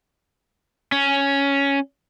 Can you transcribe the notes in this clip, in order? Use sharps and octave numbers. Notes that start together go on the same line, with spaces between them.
C#4